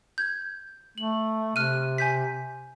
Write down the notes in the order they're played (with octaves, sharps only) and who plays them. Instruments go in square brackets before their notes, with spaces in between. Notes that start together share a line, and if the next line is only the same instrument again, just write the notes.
[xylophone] G6 G#6
[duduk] A3 [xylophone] F#7
[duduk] C3 [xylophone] F6 F#6 D#7
[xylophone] G#5 G6 B6